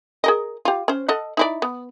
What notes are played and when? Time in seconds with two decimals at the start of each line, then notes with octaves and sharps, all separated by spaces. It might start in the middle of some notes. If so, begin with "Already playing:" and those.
0.24 G#4 A#4 D#5
0.65 F4 G4
0.88 C#4 C5
1.08 A4 D#5 F#5
1.37 D#4 E4 D5
1.62 B3